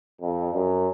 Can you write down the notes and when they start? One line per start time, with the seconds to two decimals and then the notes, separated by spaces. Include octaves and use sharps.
0.21 F2
0.54 F#2